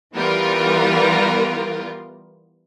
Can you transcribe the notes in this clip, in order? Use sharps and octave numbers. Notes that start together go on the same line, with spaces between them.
E3 G3 B3 F4 A#4